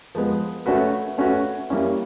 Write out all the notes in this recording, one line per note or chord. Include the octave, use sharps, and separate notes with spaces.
F3 G#3 B3
A3 C#4 F#4 B4
A3 C#4 F#4 B4
G3 A#3 C#4 E4